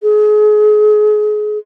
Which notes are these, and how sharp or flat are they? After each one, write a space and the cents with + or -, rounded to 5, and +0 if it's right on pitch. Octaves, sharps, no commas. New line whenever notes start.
G#4 +30